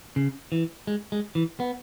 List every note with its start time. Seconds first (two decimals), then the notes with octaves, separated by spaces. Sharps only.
0.16 C#3
0.52 E3
0.87 G#3
1.12 G#3
1.35 E3
1.60 B3